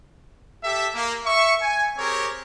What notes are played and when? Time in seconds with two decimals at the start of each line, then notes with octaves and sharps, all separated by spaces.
0.64 G4 A4 E5
0.93 A#3
1.26 E5 C#6
1.61 G#5
1.97 C4 G4 G#4 A#4 C#5